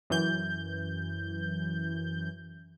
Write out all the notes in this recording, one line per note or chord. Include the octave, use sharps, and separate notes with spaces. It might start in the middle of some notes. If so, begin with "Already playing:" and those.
F#2 E3 G6